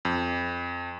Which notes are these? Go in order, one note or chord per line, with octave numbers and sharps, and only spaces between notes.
F2